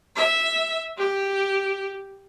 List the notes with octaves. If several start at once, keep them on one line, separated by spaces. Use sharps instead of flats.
E5
G4